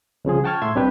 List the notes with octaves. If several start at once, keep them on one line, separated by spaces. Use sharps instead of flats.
C2 C#3 F3 G#4
F#5 G5 A5 C#6 F6 G#6
A2 E5 C6 E6 G#6
C2 C3 D4 G4 B4